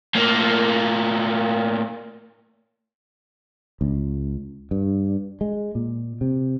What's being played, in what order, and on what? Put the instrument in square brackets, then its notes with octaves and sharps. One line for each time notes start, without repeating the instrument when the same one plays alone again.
[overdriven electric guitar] A2 A#3
[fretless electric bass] C#2
G2
G#3
A#2
C3